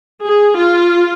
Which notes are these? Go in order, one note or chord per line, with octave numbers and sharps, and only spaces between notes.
G#4
F4